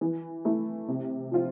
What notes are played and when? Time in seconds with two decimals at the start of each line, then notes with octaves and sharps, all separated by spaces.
0.01 E3
0.45 A3 E4
0.88 C3
1.31 F3 C4 F4